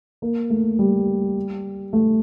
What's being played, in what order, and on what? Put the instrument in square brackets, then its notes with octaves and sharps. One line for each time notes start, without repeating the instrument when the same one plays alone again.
[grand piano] A#3
A3
G3
A3